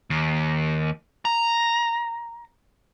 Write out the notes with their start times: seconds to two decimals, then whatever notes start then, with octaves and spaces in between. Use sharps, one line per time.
0.10 D#2
1.25 A#5